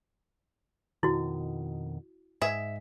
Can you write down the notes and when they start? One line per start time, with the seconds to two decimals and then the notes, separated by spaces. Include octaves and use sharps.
1.03 F2 B2 D#3 E4 F#4
2.42 G#2 G#4 E5